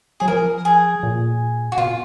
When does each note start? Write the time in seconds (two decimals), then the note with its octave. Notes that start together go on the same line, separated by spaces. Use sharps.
0.20 F#3 G#4
0.28 F3 A#4
0.65 G#4
1.03 A#2
1.72 F#4
1.78 B2 F4